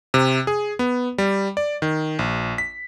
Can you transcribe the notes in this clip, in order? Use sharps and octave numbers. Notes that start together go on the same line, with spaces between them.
C3
G#4
B3
G3
D5
D#3
A#1
B6